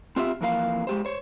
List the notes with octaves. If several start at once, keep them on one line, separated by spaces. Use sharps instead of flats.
C4 F4 G4 E5
F2 E3 A#3 F5
G#3 G4 C5
C5 C#5